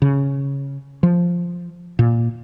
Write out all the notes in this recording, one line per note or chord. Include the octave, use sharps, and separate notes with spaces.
C#3
F3
A#2